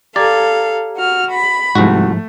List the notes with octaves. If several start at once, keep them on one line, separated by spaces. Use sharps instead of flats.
G4 A4 D5 F5 A#5 G#6
F#4 F6
B5
C2 G#2 F3 A3 F#4